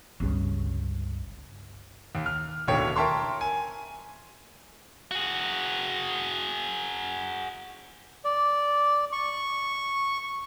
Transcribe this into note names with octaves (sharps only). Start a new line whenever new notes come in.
G1 C#2 G2 C#3
D#2
F6
D1 D#2 B2 D3 C#5 G5
A#4 E5 G5 A5 C6 C#6
G#5
F#4 G#4
D5
C#6